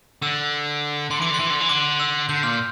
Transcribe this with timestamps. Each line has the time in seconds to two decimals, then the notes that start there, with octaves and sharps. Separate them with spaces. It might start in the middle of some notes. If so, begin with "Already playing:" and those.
0.22 D3 E6
1.10 D3 C6
1.20 E3 D6
1.30 D3 C6
1.40 E3
1.50 D3
1.60 E3
1.69 D3 D6
2.00 E6
2.29 D3 G6
2.43 A#2 F6